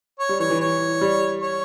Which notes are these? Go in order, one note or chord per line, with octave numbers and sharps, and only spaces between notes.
C#5
G3
E3 C#5
E3
C#5
G3
C#5